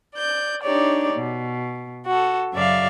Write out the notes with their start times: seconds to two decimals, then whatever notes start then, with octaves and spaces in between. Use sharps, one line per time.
0.15 D5 G6
0.62 D4 D#4 G4 C#5 D5
1.13 B2
2.06 F#4 A4
2.52 F#2 C#3 D5 E5 F5